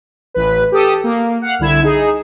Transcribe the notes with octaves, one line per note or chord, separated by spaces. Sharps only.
A1 B4
G4 A4 D#6
A#3
F5 F#5
C2 D3 E4 G#6 E7
D#4 G#4